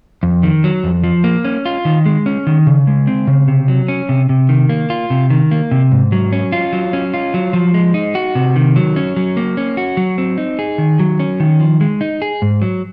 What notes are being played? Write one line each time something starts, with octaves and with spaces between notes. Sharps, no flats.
F2
D#3
F#3
F2
F3
A#3
C#4
F4
D#3
G#3
C#4
D#3
C#3
G#3
C4
C#3
C3
F#3
C#4
C3
C3
D#3
A#3
F4
C3
D#3
A#3
C3
G#2
F#3
C#4
F4
F#3
C#4
F4
F#3
F3
G#3
D#4
F#4
C3
D#3
F#3
C#4
F#3
A#3
C#4
F#4
F#3
C4
D#4
G#4
D#3
F#3
C#4
D#3
F3
G#3
D#4
G#4
G#2
F#3